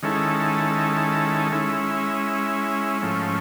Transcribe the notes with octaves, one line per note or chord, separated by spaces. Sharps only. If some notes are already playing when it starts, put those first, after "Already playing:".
D#3 G#3 C#4 E4 A4
G#3 C#4 E4
G#2 F3 A3 C#4